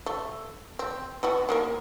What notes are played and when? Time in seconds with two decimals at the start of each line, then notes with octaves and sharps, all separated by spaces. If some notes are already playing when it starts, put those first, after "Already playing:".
0.06 A3
0.79 C4
1.23 E3 B3 F#4
1.49 D#3 A#3 A#4